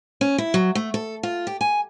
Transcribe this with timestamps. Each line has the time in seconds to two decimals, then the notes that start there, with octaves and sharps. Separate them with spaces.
0.21 C#4
0.38 E4
0.54 F#3
0.75 A3
0.94 A4
1.23 F4
1.47 G4
1.61 G#5